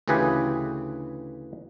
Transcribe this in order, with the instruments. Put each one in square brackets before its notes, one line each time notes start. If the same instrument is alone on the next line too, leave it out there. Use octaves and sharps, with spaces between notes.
[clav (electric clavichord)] D2 C#3 E3 G4 G#4 B4